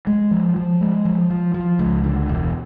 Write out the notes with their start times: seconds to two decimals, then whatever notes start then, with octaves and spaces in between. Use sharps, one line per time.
0.07 G#3
0.31 F3
0.56 F3
0.81 G#3
1.05 F3
1.30 F3
1.54 F3
1.79 C#2
2.04 D3
2.29 E1